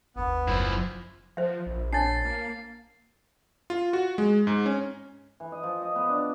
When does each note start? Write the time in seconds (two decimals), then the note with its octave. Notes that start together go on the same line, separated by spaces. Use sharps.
0.16 G1 D#2 B3
0.47 F#1 F3 E4
1.37 F3 C5 E5
1.66 A#1
1.93 D4 C#5 A5 A6 C7
2.25 A#3
3.70 F4
3.93 F#4
4.18 G#3
4.47 G#2
4.66 C#4
5.40 E3
5.52 D#5
5.63 F3
5.82 D#5
5.96 B3
6.09 D4